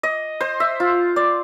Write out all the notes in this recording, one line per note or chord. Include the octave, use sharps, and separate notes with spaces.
D#5
C5
E5
F4
D5